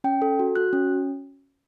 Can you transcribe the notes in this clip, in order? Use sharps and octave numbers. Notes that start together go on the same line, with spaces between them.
C#4 G5
A4
F#4
F#4 F#6
C#4